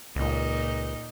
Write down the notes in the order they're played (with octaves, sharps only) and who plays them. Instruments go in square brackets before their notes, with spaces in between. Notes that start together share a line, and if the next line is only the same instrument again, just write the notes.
[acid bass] C#2 [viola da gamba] A#2 D#4